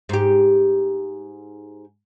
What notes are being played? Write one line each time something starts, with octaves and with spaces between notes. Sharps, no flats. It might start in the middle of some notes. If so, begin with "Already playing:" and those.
G#2 G4